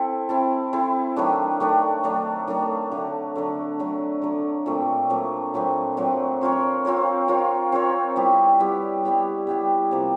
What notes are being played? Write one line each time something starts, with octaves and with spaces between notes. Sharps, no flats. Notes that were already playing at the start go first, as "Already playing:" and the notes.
Already playing: C4 E4 A4
C4 E4 A4
C4 E4 A4
D#3 F#3 A3 D4
D#3 F#3 A3 D4
D#3 F#3 A3 D4
D#3 F#3 A3 D4
D3 F#3 A3
D3 F#3 A3
D3 F#3 A3
D3 F#3 A3
A#2 F#3 A3 C4
A#2 F#3 A3 C4
A#2 F#3 A3 C4
A#2 F#3 A3 C4
C4 F4 A#4 C#5
C4 F4 A#4 C#5
C4 F4 A#4 C#5
C4 F4 A#4 C#5
G3 B3 E4 G4
G3 B3 E4 G4
G3 B3 E4 G4
G3 B3 E4 G4
C3 F3 A#3